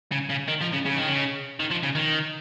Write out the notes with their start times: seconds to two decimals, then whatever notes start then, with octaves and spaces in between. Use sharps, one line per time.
0.12 C#3
0.30 C#3
0.48 D#3
0.62 F3
0.73 C#3
0.86 C#3
0.97 D#3
1.08 C#3
1.60 D#3
1.71 F3
1.83 C#3
1.95 D#3